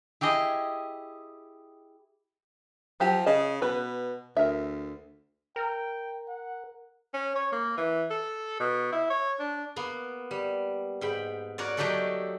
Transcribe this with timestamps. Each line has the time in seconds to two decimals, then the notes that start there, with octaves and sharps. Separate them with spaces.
0.21 E4 G4 G#4 D#5
3.00 F3 F#3 G4
3.26 C#3 D#5
3.62 B2 B4
4.37 D2 A#4 E5
5.56 A#4 G5
6.28 F#5
7.14 C#4
7.35 C#5
7.52 A#3
7.77 E3
8.10 A4
8.60 B2
8.92 E4
9.10 C#5
9.39 D4
9.76 A#3 B3
10.31 G3
11.01 G#2 G5 B5
11.58 F#4 A#4 C#5 D5
11.77 F#3 A3 D#4 G4 A4 D5